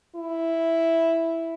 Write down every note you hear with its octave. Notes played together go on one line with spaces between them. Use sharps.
E4